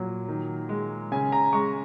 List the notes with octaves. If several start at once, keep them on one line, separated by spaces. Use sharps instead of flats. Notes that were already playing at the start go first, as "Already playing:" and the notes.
Already playing: A#2 F#3
D#3
G#3
C#3 G#5
A#5
G#3 C#6